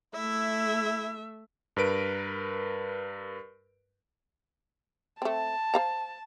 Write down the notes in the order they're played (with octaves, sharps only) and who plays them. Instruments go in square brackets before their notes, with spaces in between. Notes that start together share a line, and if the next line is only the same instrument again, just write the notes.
[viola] A3 E5 [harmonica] E4
[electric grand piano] G2 A#4 B4 D7
[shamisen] A3 C4 [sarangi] A5
[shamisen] C5 F5 A#5